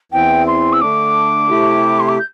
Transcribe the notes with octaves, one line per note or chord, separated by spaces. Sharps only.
E2 E3 C4 G5
C6
E6
D3 A3 D4 D6
C3 A3 E4 G4
C6
D6
G6